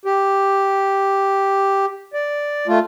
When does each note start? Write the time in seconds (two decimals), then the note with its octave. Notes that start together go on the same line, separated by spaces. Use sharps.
0.05 G4
2.14 D5
2.68 A3 F4